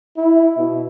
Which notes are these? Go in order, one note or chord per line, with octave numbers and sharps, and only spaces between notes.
E4
B2